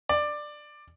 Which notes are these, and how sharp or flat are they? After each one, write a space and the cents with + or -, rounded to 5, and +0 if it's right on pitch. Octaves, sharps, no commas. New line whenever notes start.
D5 +15